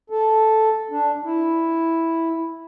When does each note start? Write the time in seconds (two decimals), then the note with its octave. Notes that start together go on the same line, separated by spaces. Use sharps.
0.10 A4
0.90 D4
1.24 E4